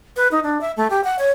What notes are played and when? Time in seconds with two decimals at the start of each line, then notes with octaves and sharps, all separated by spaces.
0.16 B4
0.31 D#4
0.43 D4
0.61 E5
0.77 A3
0.90 G4
1.04 F#5
1.19 C#5